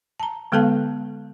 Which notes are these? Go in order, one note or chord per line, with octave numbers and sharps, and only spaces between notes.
A5 A#5
D3 G#3 B3 A4 F5 A5